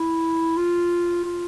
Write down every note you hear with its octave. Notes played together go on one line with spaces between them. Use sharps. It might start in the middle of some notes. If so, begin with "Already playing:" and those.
Already playing: E4
F4
F4